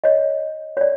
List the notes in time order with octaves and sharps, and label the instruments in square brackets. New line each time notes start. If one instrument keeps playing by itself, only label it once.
[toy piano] C#5 D#5
C#5 D5